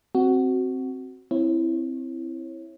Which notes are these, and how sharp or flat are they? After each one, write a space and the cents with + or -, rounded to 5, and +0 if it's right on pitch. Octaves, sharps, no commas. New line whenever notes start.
C4 +0 F#4 +10
C4 +0 E4 +0 C#5 -35